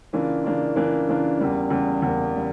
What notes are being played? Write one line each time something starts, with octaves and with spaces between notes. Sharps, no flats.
C#3 E3 A#3 D4 F4
C#3 E3 A#3 D4 F4
C#3 E3 A#3 D4 F4
C#3 E3 A#3 D4 F4
E2 C#3 G3 A#3
E2 C#3 G3 A#3
E2 C#3 G3 A#3
C#3 G3